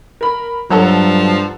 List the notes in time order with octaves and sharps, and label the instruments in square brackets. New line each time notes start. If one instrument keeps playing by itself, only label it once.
[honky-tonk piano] A#4 B5
[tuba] G2 [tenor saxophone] F3 [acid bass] F#3 [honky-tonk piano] A4 F#5 A#5